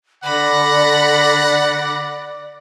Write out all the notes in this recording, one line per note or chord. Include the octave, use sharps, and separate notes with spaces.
D3 D5 F#5 B5 D6 A#6